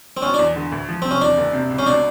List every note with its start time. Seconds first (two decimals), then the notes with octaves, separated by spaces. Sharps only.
0.17 C4
0.22 B2 C#4
0.34 E2 D4
0.56 D3
0.72 D2
0.89 F3
1.02 C3 C4
1.11 C#4
1.21 E2 D4
1.38 F#1
1.53 C3
1.70 C#2
1.79 C#4
1.87 B2 D4